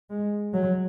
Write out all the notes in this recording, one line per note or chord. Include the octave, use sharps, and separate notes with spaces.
G#3
F#3